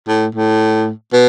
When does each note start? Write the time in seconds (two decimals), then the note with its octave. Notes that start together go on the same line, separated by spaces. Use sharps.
0.08 A2
0.35 A2
1.13 B2